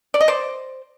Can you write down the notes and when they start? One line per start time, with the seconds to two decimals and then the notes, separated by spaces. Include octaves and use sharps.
0.14 D5
0.21 D#5
0.28 C5 D5